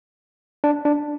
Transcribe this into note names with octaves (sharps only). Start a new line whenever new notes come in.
D4
D4